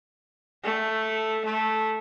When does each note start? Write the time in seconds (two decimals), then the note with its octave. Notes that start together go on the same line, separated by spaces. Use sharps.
0.63 A3
1.45 A3